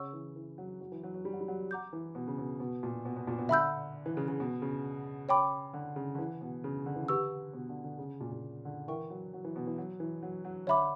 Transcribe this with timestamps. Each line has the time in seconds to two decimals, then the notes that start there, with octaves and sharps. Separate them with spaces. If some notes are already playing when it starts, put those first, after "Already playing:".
Already playing: C#3 C#5 F#5 C#6 E6
0.13 E3
0.36 E3
0.58 F#3
0.81 F#3
0.92 E3
1.03 F#3
1.14 F#3
1.25 G3
1.33 F#3
1.41 G3
1.48 F#3
1.71 F#5 A#5 D6 G6
1.93 E3
2.15 B2
2.28 C#3
2.38 B2
2.60 B2
2.83 A#2
3.05 B2
3.16 B2
3.27 A#2
3.38 B2
3.49 D3 E5 B5 E6 G6
4.06 E3
4.17 C#3
4.28 C#3
4.40 B2
4.62 C#3
5.29 C#5 G5 B5 D6
5.73 D3
5.96 C#3
6.15 D3
6.19 E3
6.41 B2
6.64 C#3
6.86 D3
6.96 E3
7.06 D3 G4 B4 F#5 C#6 E6
7.53 B2
7.69 D3
7.84 D3
7.98 C#3
8.21 A#2
8.31 A#2
8.65 D3
8.88 E3 A#4 E5 G5 C#6
9.10 F#3
9.34 F#3
9.44 E3
9.56 B2
9.67 E3
9.78 F#3
10.00 E3
10.23 F#3
10.45 F#3
10.67 D3 C#5 E5 B5 D6